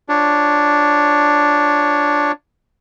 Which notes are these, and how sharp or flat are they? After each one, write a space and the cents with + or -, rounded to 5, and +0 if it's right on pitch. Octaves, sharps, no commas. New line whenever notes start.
D4 +0 F4 +0 C#5 +0